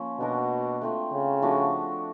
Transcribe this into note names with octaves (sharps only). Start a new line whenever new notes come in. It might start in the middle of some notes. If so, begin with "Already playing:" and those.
Already playing: F3 A#3 C#4
B2 D4 F#4 A#4
A3 C4 F4
C#3
F3 A3 D4 F#4